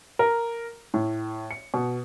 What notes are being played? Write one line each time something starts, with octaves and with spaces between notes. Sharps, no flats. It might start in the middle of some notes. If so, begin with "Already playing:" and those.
A#4
A2
C#7
B2